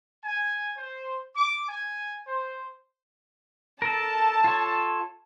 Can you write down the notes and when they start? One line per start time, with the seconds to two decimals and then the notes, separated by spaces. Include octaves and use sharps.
0.24 G#5
0.77 C5
1.36 D6
1.68 G#5
2.28 C5
3.82 A4 A#4 A5
4.44 F4 A4 C#5